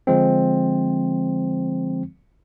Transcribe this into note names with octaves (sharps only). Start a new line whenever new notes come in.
D3 F3 G#3 C4